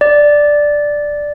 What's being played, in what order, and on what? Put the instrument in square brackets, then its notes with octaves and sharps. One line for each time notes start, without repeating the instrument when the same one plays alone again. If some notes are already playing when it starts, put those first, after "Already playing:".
[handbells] D5